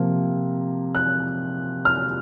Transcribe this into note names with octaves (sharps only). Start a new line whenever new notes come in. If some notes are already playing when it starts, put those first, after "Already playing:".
Already playing: C3 F3 A#3
F#6
F6